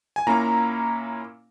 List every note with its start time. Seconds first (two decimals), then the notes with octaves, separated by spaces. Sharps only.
0.16 G#5
0.27 A#2 A#3 C#4 E4 A#5